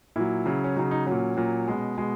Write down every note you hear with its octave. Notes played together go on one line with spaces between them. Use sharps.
A#2 F#3 E4
C#3 F#3
C#4
C#3 F#3 D#4
D#4
A#2 F#3 C#4
A#2 F#3
B2 G#3
B2 G#3